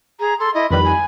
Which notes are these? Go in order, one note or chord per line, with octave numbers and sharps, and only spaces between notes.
G#4 A#5
A4 C6
E4 D#5
F2 D#3 G3 B4 B5
G#5